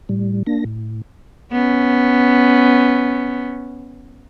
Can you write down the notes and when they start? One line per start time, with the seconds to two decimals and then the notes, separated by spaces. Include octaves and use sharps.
0.09 A2 G3
0.47 A#3 D4 A#6
0.65 A2
1.52 B3 C#4